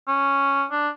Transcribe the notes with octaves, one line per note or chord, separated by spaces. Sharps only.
C#4
D4